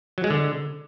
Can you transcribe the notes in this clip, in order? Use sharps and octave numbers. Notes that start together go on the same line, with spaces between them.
F#3
G#3
D3